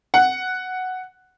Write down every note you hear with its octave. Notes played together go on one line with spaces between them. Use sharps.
F#5